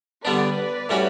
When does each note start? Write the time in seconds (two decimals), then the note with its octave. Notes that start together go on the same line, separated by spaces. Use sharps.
0.25 D3 G3 B3 D4 B4 D5
0.89 A2 G3 C#4 F#4